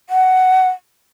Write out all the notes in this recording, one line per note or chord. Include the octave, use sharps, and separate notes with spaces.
F#5